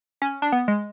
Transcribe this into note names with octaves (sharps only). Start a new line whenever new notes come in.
C#4
D4
B3
G#3